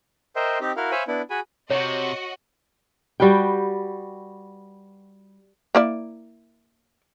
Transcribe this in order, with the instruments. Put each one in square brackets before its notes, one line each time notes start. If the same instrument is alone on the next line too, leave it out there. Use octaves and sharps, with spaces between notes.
[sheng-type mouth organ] A#4 C5 D#5 E5 G5 C6
C4 D#4 G4
E4 F#4 A#4 F5
C5 C#5 E5 F5 G#5 B5
B3 D4 E4
F#4 G#4 G#5 B5
[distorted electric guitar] C3 [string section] F#4 D#5 [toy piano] C#5
[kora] G3 F#4 B4 G5
[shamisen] A#3 E4 D5